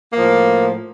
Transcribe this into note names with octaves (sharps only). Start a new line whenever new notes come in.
A2 F3 A#3